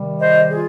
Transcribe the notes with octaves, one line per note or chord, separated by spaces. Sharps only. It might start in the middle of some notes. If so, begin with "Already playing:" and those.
Already playing: C3 D#3 G3
C5 D#5
F4 G#4